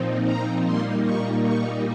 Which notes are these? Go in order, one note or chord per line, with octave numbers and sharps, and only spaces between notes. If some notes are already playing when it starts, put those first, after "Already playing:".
Already playing: A#2 F3 C4 D#4
A#5
A#2 G3 A#3 D#4 C6
C#6
C#6